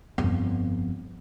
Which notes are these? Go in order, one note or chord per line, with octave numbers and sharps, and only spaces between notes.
G1 F2